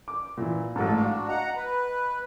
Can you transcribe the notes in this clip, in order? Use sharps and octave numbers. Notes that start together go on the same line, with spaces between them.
D6
A#2 E3
A1 G#2 A3 A4
D4 F#4 F5
D#5 F#5 A#5
B4